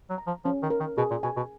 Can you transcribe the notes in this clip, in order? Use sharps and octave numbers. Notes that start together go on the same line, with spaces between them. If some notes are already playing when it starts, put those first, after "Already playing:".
F#3
A#5
F3
F3 C#4
D#3
A#4
D#3
B2 G#4
A#2
B2 G#5
B2